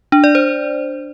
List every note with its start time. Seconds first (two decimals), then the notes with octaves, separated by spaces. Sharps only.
0.12 D4
0.24 D5
0.35 C5